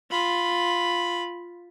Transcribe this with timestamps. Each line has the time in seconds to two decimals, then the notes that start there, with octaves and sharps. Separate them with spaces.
0.11 F4 B5